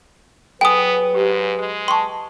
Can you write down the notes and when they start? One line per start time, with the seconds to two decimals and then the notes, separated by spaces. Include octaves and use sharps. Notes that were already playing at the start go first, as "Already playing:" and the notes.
0.61 F#3 B3 G#4 A4 B4 G5 G#5 D#6
1.14 G#2 G4
1.59 G#3
1.88 G5 A5 C6 C#6